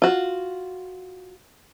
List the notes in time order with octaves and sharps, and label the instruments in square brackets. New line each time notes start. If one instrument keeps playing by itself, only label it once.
[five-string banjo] F4 F#4